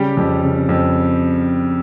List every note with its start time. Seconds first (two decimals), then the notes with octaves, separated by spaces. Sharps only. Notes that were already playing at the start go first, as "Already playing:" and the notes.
Already playing: C#3 G3 G4
0.17 F2
0.43 C#3
0.69 F2